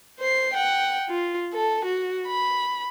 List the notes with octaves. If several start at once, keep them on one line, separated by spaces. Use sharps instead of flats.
C5 C7
F#5 G5
F4
A4
F#4
B5